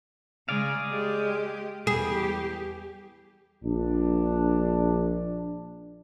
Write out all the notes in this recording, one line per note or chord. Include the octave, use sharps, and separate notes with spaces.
C#3 G#3 G#4 D5 F5
G#3 G4
E2 G3 G4 G#4
A#1 D4